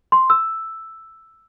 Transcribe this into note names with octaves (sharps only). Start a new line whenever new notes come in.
C6
E6